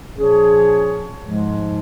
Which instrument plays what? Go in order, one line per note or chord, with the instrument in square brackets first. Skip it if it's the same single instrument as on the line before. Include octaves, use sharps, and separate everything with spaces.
[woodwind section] A#2 F3 C#4 G#4 C#5
G#2 F3 G#3